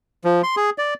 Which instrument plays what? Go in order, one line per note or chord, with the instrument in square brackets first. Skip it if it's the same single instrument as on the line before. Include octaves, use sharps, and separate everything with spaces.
[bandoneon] F3
C6
G#4
D5